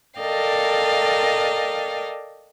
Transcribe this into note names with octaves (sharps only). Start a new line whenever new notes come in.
A4 A#4 D5 D#5 F5 G5